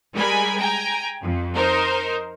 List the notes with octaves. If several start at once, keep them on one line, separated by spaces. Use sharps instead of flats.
G3 G#3 A#4 G#5 B5
G5 G#5 A#5
F2
D#4 A#4 C5